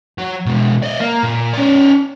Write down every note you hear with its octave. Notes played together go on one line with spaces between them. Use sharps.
F#3
B2 G#3
D5 D#5
A#3
A#2
C#4 D5